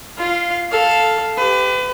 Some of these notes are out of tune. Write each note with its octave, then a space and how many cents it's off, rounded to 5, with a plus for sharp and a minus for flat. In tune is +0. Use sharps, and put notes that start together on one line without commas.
F4 -15 F5 +0
A4 +0 F5 +0
G4 +5 B4 +35